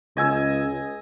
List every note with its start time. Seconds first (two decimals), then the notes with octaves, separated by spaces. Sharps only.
0.17 C#2 D#5 G#5 E6